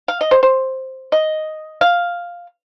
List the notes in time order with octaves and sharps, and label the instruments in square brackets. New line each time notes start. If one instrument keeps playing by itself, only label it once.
[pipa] F5
D#5
C5
C5
D#5
F5